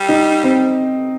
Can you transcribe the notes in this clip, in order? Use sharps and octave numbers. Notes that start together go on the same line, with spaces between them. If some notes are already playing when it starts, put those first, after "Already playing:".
Already playing: G3
D#4
C4